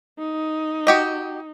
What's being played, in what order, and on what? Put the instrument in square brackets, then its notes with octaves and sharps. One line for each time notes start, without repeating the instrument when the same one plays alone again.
[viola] D#4
[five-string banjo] F#4 G4 D#5